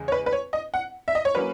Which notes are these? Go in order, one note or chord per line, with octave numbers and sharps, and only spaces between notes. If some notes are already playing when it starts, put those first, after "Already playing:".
Already playing: E2 C#3 G#3
C#5
B4
B4
C#5
D#5
F#5
E5
D#5
C#5
F#3 A#3 C#4 B4